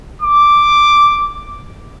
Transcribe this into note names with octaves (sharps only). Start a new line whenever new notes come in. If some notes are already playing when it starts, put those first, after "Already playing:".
D6